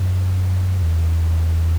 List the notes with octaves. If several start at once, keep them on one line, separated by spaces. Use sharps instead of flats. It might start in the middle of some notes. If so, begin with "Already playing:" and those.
Already playing: F#2
E2